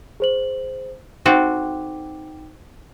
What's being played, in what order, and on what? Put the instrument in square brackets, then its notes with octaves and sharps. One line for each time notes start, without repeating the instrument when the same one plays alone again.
[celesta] G#4 C5 F#7
[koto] C4 F#4 A4 [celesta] D#4 G5 D6